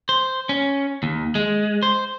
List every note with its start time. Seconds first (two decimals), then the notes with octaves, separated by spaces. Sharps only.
0.09 C5
0.49 C#4
1.03 D#2
1.35 G#3
1.83 C5